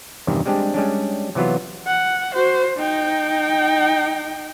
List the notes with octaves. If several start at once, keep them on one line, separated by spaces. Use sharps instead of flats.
E2 G2 C3 D#3
G3 G#3 C4 D4 G4
G3 G#3 C#4 D4
C3 E3 F#3 B3 F4
F#5
F#4 C5
D#4 G5